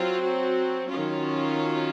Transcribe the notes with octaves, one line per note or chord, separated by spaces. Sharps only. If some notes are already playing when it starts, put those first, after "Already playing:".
Already playing: F#3 C4 F4
F#4
D#3 F#3 C#4 F4